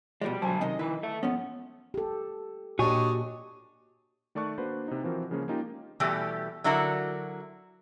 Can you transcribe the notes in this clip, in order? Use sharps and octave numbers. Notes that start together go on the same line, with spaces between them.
B2 F3 G#3 G4 D5
B1 D3 F#3 C5 G#5 A5
F#2 C3 D#3 D#5
D#3 E4 B4
A4 E5
G#2 F3 B3 C#4
G4 A4
A#2 D4 F#4 G4 C#5 D#5 G#5
D#3 A3 D5 A5 C#6 F#6
A#3 D4 F#4 B4 C5
C3 D#4
E3 F3 C4 F#4 A#4
C#3 F3 G#3 A#3 C#4
A#3 C#4 D#4 F4 G4
B2 E3 G3 A3 G4
D3 F#3 E4 F#4 A#4